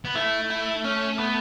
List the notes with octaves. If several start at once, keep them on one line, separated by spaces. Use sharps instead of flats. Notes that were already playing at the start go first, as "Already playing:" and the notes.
B3
A3 E4
E4
C#4
B3